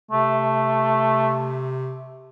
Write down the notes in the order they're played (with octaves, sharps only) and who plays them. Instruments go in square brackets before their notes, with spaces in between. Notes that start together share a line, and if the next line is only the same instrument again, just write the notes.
[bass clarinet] C3 [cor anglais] A3